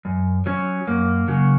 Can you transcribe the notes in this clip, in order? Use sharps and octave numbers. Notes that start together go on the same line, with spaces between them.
F#2
F#3 C#4
F#2 A#3
C#3 F#3